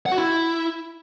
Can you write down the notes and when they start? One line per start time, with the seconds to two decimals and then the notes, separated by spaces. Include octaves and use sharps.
0.06 F#5
0.12 F#4
0.17 E4